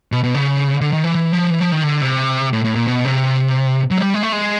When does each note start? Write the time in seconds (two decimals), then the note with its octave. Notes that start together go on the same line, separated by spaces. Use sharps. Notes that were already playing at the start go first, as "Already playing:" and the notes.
0.12 B2
0.24 B2
0.34 C#3
0.81 D3
0.93 D#3
1.04 E3
1.15 E3
1.32 F3
1.50 E3
1.61 F3
1.72 D#3
1.84 D3
2.02 C3
2.53 A2
2.64 A2
2.75 A#2
2.87 B2
3.05 C3
3.91 F#3
3.98 G#3
4.02 G3
4.14 G#3
4.23 A3
4.32 G#3